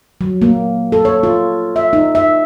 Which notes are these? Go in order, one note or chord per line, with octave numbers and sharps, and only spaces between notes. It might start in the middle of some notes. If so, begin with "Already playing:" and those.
F#3
A#3
A4
C#5
F4
E5
D#4
E5